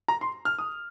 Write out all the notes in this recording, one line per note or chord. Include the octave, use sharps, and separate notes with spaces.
A#5
C6
F6
D#6